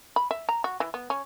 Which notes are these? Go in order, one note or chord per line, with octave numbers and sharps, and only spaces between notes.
B5
E5
A#5
F#4
E3
B3
C#4